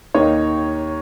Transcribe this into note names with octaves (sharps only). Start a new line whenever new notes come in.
D#2 D#3 A#3 D#4 C#5